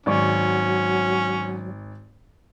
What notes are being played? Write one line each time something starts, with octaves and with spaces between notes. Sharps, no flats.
G#1 F#3 C#4 D5 C#6